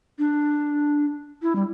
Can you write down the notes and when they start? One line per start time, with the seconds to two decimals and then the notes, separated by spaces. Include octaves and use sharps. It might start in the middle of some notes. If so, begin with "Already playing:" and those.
0.19 D4
1.42 E4
1.55 G3